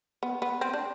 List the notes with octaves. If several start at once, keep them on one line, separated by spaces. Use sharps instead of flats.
B3
B3
C4
D4